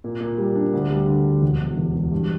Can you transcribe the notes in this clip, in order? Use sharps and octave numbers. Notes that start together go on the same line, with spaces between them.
A#2
A#2
G3
D4
D2
G3
D3
D2
E1
E2
E1
E1
G2